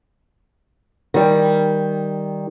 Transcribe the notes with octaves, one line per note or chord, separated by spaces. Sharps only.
D#3 G3